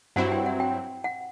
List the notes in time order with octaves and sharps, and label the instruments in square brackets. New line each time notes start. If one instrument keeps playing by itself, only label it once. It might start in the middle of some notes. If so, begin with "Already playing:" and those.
[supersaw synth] G2 F#3 C4 E4 [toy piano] F#5
[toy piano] G5
F#5
G5
F#5